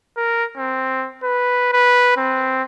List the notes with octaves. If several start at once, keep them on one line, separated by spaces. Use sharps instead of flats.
A#4
C4
B4
B4
C4